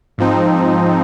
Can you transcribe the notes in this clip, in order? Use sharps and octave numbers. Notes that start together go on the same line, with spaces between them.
G#2 F3 C4 D#4